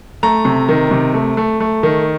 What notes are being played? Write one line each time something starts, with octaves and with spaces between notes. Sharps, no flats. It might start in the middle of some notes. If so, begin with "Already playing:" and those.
A3 A#5
C3
D#3
C3
A3
A3
A3
D#3